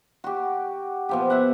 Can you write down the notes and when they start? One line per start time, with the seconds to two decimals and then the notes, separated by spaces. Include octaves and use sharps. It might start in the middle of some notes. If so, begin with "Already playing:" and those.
0.24 F#4 G4
1.09 B2 F3 G4
1.30 E5 F#5